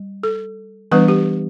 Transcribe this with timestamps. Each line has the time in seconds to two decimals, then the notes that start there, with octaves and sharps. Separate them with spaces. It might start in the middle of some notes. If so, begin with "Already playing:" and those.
Already playing: G3
0.23 A4
0.92 E3 G3 B3 D4 B4
1.08 G4